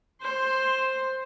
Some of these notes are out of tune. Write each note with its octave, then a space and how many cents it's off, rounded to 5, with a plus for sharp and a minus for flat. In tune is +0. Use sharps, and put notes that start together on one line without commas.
C5 +10 C6 +0